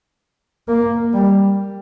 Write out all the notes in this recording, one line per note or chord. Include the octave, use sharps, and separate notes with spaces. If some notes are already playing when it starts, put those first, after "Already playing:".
A#3
G3